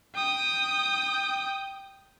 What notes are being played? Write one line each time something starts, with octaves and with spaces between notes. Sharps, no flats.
G5 D#6